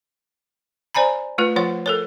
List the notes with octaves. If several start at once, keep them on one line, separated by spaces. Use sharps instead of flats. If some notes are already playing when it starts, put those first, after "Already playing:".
C5 D5 G#5 A#5 B5
A3 F4 B4
F3 F4 C#5 F#5
A4 A#4 C#5